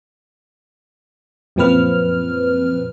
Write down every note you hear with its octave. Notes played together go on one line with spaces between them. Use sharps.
F#2 A#2 F3 C4 B4 F6